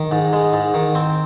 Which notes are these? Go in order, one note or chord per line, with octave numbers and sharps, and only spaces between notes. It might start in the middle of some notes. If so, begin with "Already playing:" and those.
Already playing: D#3
G#2
G#3
G#2
D#3
C4